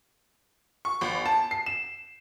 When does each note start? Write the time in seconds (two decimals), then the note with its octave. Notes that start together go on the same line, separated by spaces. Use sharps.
0.85 C#6
1.01 G1
1.26 A5
1.51 C7
1.66 E7